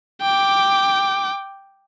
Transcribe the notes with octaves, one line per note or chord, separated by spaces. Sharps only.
G5 D6